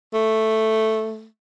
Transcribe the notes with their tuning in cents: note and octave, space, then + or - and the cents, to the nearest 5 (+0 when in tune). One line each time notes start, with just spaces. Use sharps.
A3 +0